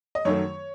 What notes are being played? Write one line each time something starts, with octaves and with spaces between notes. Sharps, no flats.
D#5
F#2 D#3 F#3 A3 C#5